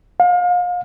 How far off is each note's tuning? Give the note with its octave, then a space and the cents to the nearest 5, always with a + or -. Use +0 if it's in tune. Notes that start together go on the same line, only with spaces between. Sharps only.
F5 +35